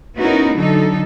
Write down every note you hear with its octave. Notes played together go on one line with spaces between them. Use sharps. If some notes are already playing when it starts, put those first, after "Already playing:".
B3 C#4 D#4 E4 F#4 A#4
D3 F#3 D#4 A4